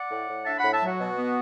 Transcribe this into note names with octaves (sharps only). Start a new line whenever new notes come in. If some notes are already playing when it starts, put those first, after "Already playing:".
Already playing: D5 F#5
A2
A2
D4 E5 A5
A2 F#5 B5
E5 A5
F#3
F#4
B2
B3